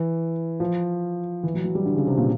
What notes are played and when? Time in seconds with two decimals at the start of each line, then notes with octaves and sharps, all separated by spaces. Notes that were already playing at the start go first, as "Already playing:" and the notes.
Already playing: E3
0.60 F3
1.43 E3
1.54 F#3
1.64 F#3
1.75 G3
1.86 D3
1.96 C#3
2.07 C3
2.17 A#2